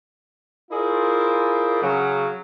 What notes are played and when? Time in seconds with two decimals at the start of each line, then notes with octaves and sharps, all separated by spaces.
0.71 E4 F4 G#4 A#4 C5 D5
1.83 C#3 F#3